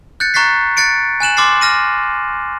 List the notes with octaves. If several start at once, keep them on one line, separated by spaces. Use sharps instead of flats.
F#6 G6 A6 C#7
A#5 C#6 F#6 A6 B6 C7
F#6 A6 C#7 D7
G#5 F#6 E7 F#7
C6 D6 F6 A6 C7
F6 A#6 D#7